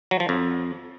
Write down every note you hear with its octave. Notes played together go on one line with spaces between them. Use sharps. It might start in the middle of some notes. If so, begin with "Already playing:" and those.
F#3
F3
F2